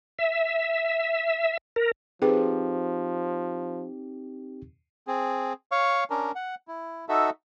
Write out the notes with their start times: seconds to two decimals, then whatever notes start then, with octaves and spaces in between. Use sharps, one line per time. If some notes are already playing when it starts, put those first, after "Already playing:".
0.19 E5
1.76 A#4
2.22 F3 C4 D#4 G4 G#4 B4
5.07 C4 G#4
5.71 C#5 F5 C#6
6.10 C#4 D4 A#4
6.35 F#5
6.68 E4
7.09 D#4 F#4 A4 E5